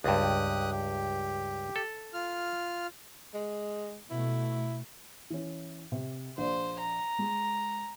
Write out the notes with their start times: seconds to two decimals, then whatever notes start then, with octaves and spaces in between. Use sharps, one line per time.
0.04 C#2 G2 G4 D#6 F#6
0.71 G4
1.76 A4
2.14 F4 F6
3.34 G#3
4.10 B2 A3 E4
5.30 E3 C#4
5.92 C3
6.38 A#1 C5 D5
6.80 A#5
7.19 G#3